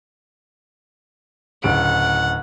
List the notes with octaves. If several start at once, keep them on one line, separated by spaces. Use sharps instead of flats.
D1 C#3 F#5 D7